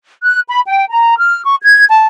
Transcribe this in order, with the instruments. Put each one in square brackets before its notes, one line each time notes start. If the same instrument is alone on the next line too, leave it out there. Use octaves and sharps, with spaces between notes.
[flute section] F#6
B5
G5
A#5
F6
C#6
G#6
A5